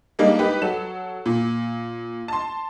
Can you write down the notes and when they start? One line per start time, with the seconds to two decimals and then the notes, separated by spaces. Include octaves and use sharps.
0.19 G3 G#3 A#3 D4 D#4
0.38 D#4 G4 B4
0.62 F#3 A4 E7
1.26 A#2
2.28 A5 C6